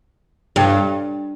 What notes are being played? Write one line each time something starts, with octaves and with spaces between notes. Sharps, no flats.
G2